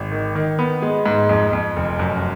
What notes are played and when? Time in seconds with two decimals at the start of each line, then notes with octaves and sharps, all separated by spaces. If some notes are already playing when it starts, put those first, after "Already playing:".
Already playing: G#1
0.12 D#3
0.35 D#3
0.59 B3
0.82 G#3
1.06 G#2
1.29 F2
1.53 F2
1.76 F1
1.99 F#2